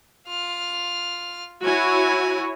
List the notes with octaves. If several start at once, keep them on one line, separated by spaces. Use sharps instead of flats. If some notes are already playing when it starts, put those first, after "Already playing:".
F4 F6
E4 F#4 C#5 G#5